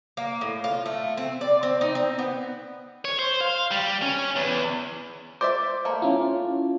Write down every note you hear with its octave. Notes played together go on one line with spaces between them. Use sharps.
A#3
A2
F4
A3
C4
D5
C4
D#4
C4
B3
C#5
C5
F5
G3
C#4
E2
C5 D5 E5 D6
A3 A#3
C#4 E4 F4